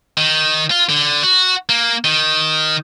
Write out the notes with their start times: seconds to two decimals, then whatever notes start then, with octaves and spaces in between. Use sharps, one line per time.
0.17 D#3
0.71 F4
0.89 D3
1.23 F#4
1.69 A#3
2.04 D#3